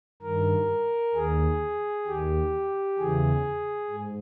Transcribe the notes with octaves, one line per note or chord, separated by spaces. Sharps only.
G2 D#3 A#4
D#2 D#3 G#4
D#2 D#3 G4
E2 C#3 E3 G#4
G#2